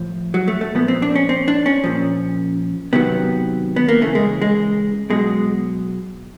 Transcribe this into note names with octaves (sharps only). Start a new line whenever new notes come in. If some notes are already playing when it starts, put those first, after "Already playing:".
Already playing: A2 F3
F#3
A3
A3
A#2 F3 B3
C4
D4
C#4
C4
D4
C#4
A#2 F3
C3 D#3 F#3 B3
B3
A#3
C#3 E3 A3
G#3
G#3
B2 F#3 G#3